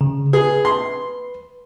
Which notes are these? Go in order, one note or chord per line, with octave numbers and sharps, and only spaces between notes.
C#3
G#4 B4
C6